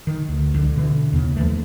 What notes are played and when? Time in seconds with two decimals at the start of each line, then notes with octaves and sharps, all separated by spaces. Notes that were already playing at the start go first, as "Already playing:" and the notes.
0.07 D#3
0.29 D2
0.54 C#2 D3
0.76 B2 D3 E3
1.13 D#2 C#3
1.36 D#2 E3 F3 A3